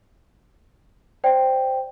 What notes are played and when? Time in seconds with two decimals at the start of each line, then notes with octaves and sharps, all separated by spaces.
1.24 C5 D5 G5